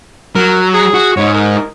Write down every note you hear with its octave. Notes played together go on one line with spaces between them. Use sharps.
F#3 A#4
G#4
F#4
G#2 D#4 C#5
A#4